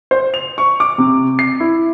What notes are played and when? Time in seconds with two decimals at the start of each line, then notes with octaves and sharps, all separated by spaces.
0.11 C5
0.34 F7
0.58 C#6
0.80 D6
0.98 C3
1.39 C7
1.60 E4